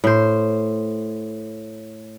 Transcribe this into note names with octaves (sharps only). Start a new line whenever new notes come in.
A2 C5